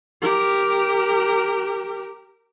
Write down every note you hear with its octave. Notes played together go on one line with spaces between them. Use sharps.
G4 A#4